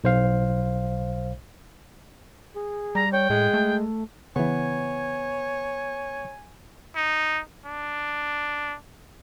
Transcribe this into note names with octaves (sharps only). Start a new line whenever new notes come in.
B1 C5 F5
G#4
G3 A#5
C#5 G5
A2 G#3
A3
C#3 E3 B3 C#5 G#5
D#4
D4